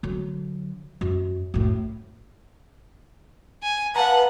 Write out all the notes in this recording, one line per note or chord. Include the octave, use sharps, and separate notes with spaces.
D3 F#3
F#2
F#2 A2
G#5
B4 F5 F#5 A5 A#5